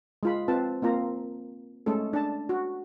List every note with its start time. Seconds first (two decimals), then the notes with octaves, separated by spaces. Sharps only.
0.23 G#3 F4 B5
0.48 C4 F4 B4 A5
0.82 A#3 C4 F4 A#5
1.86 G#3 A3 C#4 A4
2.13 D4 A5
2.49 F#4